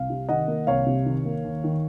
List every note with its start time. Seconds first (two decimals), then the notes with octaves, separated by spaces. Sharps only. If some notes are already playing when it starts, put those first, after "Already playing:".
Already playing: C2 F5
0.10 C3
0.29 D#3 D#5 F#5
0.48 A#3
0.67 C2 C#5 F5
0.86 C3
1.06 D#3
1.25 A#3
1.44 D#2
1.64 D#3